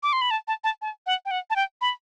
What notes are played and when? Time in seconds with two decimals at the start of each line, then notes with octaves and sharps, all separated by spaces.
0.03 D6
0.13 C6
0.21 B5
0.31 A5
0.48 A5
0.64 A5
0.82 A5
1.06 F#5
1.25 G5
1.31 F#5
1.50 A5
1.56 G5
1.81 B5